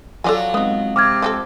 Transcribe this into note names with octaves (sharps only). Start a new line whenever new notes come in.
F#3 F4 A4 D5 G#5
G#3 B3 C4 D#4
C3 D6 F6 G#6
F3 G4 A4